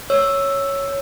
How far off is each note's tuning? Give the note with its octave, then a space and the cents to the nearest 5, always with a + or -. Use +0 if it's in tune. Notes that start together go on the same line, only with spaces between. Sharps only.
C#5 +0 E6 +0